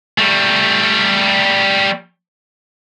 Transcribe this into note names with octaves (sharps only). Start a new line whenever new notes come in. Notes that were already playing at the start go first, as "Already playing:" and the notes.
G3 A3